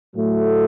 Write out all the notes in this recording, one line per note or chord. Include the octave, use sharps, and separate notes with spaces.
A2 F#3 A3